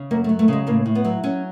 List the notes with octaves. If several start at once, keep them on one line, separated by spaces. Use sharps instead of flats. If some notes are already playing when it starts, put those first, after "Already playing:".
Already playing: C#3
F#2 A#3
A3
F#3
A3
C#3 G#3
A2 A#3
A2
B3
F#3
F#3 C#4